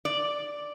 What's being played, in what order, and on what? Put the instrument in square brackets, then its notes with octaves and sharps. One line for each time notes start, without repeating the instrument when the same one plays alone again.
[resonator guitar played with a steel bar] D5